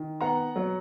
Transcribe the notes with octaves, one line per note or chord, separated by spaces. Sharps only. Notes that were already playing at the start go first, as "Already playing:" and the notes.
Already playing: D#3
B3 F#5 A#5
F#3